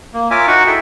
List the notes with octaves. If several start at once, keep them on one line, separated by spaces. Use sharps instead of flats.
A#3
F4 A#4 C#5 E5 G#5 D6
D#4 F#4 F#5 C#6
E4 G#4 A4 E5 G5